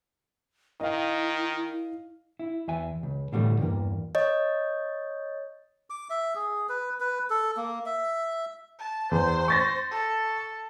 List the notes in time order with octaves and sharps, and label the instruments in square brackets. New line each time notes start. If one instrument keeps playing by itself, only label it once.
[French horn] D#3 [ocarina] E4 [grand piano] D#5 F5
[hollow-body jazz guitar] E4
E2 E5 G#5
C#2
A2 D3 E3 G3 A3
E2 G2 A#3
[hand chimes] C#5 D#5
[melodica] D6
E5
G#4
B4
B4
A4
A#3
E5
[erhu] A5
[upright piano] E2 [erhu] C5
[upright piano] C#6 A6 A#6
[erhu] A4